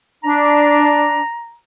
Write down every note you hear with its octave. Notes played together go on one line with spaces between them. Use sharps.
D4 A#5